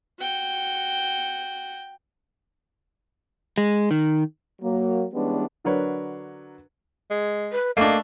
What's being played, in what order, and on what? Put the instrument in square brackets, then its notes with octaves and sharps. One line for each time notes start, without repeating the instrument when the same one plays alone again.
[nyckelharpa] F#4 G5
[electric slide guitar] G#3
D#3
[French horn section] F#3 A#3
E3 G3 G#3 B3 C#4 D4
[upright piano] D3 F#3 D4 A#4 B4 C#5
[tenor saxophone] G#3
[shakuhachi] B4
[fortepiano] A3 D4 [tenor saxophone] A#3 [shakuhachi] D#5